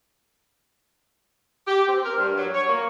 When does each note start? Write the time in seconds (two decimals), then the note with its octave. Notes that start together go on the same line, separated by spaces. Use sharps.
1.68 G4
1.89 C4
2.05 A#4
2.18 G2
2.37 F#3
2.54 C#5
2.69 A#3